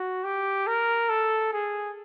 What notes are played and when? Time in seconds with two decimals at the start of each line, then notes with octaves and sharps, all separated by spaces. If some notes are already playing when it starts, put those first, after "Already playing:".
Already playing: F#4
0.24 G4
0.67 A#4
1.09 A4
1.53 G#4